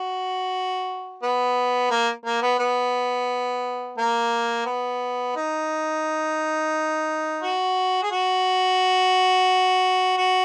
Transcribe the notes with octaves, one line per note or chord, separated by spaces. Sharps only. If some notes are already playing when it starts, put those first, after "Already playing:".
Already playing: F#4
B3
A#3
A#3
B3
B3
A#3
B3
D#4
F#4
G#4
F#4
F#4